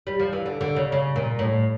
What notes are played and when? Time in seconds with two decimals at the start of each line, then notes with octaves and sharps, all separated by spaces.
0.07 G3
0.20 F3
0.33 E3
0.46 D3
0.61 D3
0.76 C#3
0.92 C#3
1.16 A#2
1.39 A2